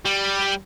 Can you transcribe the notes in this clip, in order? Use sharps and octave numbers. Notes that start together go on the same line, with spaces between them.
G3